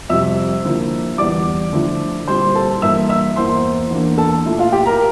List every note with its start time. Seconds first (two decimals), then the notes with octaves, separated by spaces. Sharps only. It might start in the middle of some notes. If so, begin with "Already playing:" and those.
0.09 F2 C3 G3 E5 E6
0.65 D3 F3 A#3 E4
1.18 E2 E3 G3 D5 D6
1.73 D3 F3 A3 E4
2.28 A#2 G3 C4 E4 C5 C6
2.55 A4 A5
2.82 G2 E3 A#3 E5 E6
3.09 E5 E6
3.36 E2 E3 A#3 C5 C6
3.90 E2 E3 A#3 D4
4.18 A4 A5
4.46 A#2 A3 E4
4.59 F4 F5
4.72 G4 G5
4.86 A#4 A#5